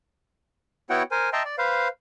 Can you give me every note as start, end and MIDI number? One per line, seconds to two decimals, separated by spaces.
0.90 1.03 59
0.90 1.03 64
0.90 1.03 66
0.90 1.03 73
0.90 1.03 78
0.90 1.03 79
1.11 1.29 70
1.11 1.29 72
1.11 1.29 80
1.33 1.43 75
1.33 1.43 76
1.33 1.43 79
1.33 1.43 81
1.33 1.43 82
1.33 1.43 84
1.45 1.55 74
1.58 1.88 71
1.58 1.88 72
1.58 1.88 77